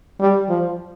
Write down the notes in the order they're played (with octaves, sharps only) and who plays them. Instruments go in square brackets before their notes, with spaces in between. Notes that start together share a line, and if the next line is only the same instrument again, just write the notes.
[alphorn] G3
F3